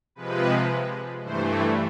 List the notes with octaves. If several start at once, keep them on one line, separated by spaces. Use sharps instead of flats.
C3 F3 G#3 B4
G2 E3 A3 C5